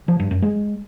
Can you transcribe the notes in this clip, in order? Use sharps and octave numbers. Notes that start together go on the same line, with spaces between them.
F3
G2
F#2
G#3